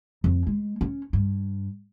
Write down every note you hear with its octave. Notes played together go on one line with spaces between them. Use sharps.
F2
G#3
C#4
G2